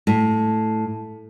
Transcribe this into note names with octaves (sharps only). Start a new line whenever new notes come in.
A2